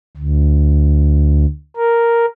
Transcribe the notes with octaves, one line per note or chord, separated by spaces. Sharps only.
D2
A#4